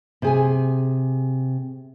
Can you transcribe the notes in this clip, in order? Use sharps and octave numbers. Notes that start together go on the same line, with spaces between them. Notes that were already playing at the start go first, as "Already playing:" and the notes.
C3 G#4 G#5